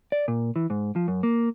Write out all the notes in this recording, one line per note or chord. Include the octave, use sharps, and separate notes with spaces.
D5
A#2
E3
G#2
F3
F#2
A#3